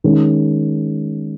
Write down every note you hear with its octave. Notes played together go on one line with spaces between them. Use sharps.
D#3 G#3 C#4